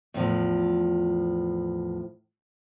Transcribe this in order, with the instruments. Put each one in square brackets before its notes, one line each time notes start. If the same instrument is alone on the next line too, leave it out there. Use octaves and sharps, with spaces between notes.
[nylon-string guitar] E2 A2 F3